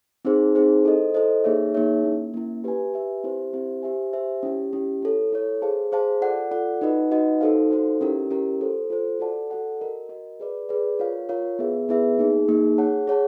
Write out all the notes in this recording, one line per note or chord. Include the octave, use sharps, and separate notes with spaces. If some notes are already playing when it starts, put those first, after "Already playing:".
C4 D#4 G#4 C5
C4 D#4 G#4 C5
E4 A4 C5 D#5
E4 A4 C5 D#5
A#3 D#4 G#4 C#5 E5
A#3 D#4 G#4 C#5 E5
A#3 C#4 E4
A#3 C#4 E4
G4 B4 E5 G#5
G4 B4 E5 G#5
C4 E4 G4 C5 E5
C4 E4 G4 C5 E5
G4 C5 E5 G#5
G4 C5 E5 G#5
C#4 E4 G4
C#4 E4 G4
E4 A4 C#5
E4 A4 C#5
G#4 C5 F5 A5
G#4 C5 F5 A5
F4 A4 D5 F#5
F4 A4 D5 F#5
D#4 F#4 B4 D#5 F#5
D#4 F#4 B4 D#5 F#5
D#4 F#4 A4 C5 F5
D#4 F#4 A4 C5 F5
C#4 E4 G4 A#4
C#4 E4 G4 A#4
F4 A4 C5
F4 A4 C5
F#4 A4 D5 F#5 A5
F#4 A4 D5 F#5 A5
F#4 A#4 D#5
F#4 A#4 D#5
G#4 B4 D5
G#4 B4 D5
F4 A#4 C#5 F5
F4 A#4 C#5 F5
B3 E4 G#4 B4 E5
B3 E4 G#4 B4 E5
A#3 D#4 G#4
A#3 D#4 G#4
G#4 C#5 F#5 A5
G#4 C#5 F#5 A5